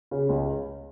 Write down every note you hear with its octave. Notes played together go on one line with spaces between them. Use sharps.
C#3
C#2